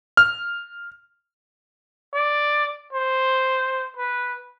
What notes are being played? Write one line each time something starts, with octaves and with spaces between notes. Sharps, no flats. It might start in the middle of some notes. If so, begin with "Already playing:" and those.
F6
D5
C5
B4